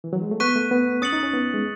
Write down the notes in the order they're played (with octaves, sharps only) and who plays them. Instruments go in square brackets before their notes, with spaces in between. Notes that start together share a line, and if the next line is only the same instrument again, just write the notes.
[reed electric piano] E3
F#3
G#3
A3
[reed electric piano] B3 [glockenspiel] C#6 F#6 B6 D#7
[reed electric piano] A3
B3
[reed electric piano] C#4 [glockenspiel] D#6 A6 C#7 F#7
[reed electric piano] D#4
C#4
B3
G#3